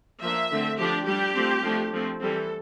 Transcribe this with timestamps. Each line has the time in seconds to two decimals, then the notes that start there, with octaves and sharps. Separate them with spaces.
0.22 F3 A#3 D4 E5
0.51 D3 A3 C4
0.78 F3 A3 D4 G4
1.07 G3 D4 G4
1.35 F3 A3 C4
1.64 F3 A3 D4
1.93 F3 A3 C4
2.21 E3 G3 C4 A4